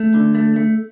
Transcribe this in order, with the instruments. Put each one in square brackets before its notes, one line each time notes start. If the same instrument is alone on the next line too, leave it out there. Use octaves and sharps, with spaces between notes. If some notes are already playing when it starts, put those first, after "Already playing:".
Already playing: [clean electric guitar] A3
D3
A3
A3